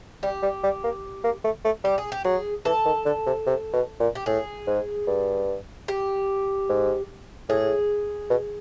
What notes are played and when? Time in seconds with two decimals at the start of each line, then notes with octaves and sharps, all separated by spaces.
0.23 G3 G4
0.43 G3
0.64 G3
0.84 A#3
1.24 A#3
1.44 A3
1.65 A3
1.84 G3 G4
1.98 G#4
2.12 G4
2.24 F#3 G#4
2.65 E3 A4
2.85 D#3
3.05 D3
3.26 C3
3.46 C3
3.73 B2
4.00 A#2
4.15 G4
4.26 A2 G#4
4.67 G#2
5.07 G2
5.88 G4
6.69 G#2
7.49 A2 G#4
8.30 B2